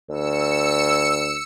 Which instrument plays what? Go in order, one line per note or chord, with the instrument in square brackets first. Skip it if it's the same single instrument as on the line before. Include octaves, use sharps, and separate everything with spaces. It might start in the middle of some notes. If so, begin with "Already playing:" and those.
[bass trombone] D2 [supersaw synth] E6 C#7